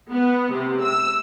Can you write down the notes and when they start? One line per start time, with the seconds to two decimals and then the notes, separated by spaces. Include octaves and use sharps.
0.11 B3
0.52 C3
0.82 E6